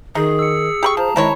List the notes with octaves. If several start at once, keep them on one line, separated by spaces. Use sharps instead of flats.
D#3 D#4 G#4
E6 C#7
G4 B5 C#6
F3 C5 A5 A#5
C3 D#3 G#3 E4 C#5